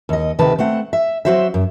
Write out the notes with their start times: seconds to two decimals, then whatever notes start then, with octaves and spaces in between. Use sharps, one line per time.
0.09 D#2 D#5
0.39 D2 C3 D#3 B4 A5
0.59 A3 C4 F#5
0.93 E5
1.25 F#3 A3 C4 F#4 C5 E5
1.54 F#2